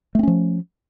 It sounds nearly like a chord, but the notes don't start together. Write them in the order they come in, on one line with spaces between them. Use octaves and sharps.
A3 C4 C#4 F3